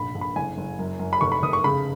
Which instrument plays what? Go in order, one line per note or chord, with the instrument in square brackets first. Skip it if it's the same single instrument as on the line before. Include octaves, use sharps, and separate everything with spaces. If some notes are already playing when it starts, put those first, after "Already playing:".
Already playing: [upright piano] F1 A#1 B5
A#1
B5
F#1 G#5
F#1
F#2
F#2
B5
F1 C#6
B5
F1 D#6
C#6
C#3 B5